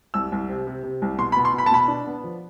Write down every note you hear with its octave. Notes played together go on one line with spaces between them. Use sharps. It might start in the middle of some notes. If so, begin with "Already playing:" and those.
C2 E6
C2
C3
C3
C3
C2
B2 C6
B5
B2
C6
B2
B5
A5
B2 B5
D4
B3
F3